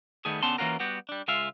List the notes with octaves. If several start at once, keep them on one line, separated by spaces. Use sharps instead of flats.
D#3 G3 A3 B3 G#4
D3 B3 C#4 A5 C6
E3 A#3 C#4 F4 F#4 A#4
G3 B3 F#4 G4
G3 D4
C#2 G#3 F4 E5 F5